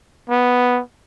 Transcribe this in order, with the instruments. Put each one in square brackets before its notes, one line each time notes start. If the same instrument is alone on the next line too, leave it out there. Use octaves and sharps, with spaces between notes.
[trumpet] B3